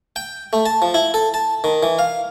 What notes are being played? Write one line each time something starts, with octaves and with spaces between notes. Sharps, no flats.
G5
A3
A5
F3
E4
A4
A5
D#3
E3
F5